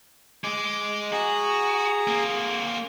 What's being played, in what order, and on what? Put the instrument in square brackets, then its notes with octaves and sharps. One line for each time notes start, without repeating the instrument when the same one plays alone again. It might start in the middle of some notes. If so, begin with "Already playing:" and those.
[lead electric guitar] G#3 G#4 [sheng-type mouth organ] D6
[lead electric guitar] F#4 [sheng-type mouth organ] G#4 A#5
[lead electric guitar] A#3 C4